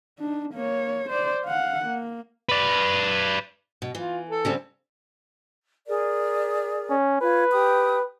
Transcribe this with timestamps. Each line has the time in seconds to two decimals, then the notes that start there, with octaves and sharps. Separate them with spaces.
0.19 D4 D#4
0.54 A#3 C#5
1.09 C5 D5
1.45 F5 F#5
1.85 A#3
2.49 B4 D5
3.82 B2
3.95 E3 F4
4.29 A4
4.45 C#3 G3 C4
5.88 G#4 A#4 D5
6.89 C#4
7.21 F4 B4 C#5
7.52 G4 G5 D#6